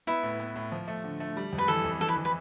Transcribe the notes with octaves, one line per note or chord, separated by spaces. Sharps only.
B3 E4
A2
B3
A2
F3
A3
D3
A3
G3
F2
B4
E3 A4
F2
E3 A4
B4
E3
B4